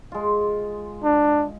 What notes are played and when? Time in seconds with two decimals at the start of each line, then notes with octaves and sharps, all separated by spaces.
0.12 G#3 F4
1.04 D4